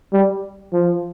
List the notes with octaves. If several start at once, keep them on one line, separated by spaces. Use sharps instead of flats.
G3
F3